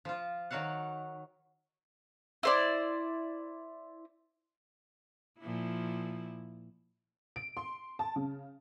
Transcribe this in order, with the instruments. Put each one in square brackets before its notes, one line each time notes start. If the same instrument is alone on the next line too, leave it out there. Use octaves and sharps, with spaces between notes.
[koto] F3 F4
D#3 F#3 F#4 F5 F#5
[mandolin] E4 C5 D5
[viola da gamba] A#2 F3 E4
[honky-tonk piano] D7
C6
A5
C#3